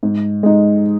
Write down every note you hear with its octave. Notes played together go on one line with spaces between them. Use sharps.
G#2
G#3 D#4